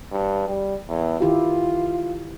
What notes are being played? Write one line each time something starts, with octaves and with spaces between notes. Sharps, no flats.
G2
G3
E2
D#3 E4 F4 G4